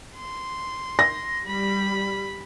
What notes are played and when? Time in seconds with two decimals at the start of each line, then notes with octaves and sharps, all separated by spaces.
0.17 C6
0.99 A#6
1.46 G3 B5